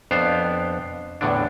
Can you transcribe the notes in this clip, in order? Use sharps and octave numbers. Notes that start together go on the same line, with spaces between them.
F2 B3 D4 C5 F5
E2 A2 D3 D4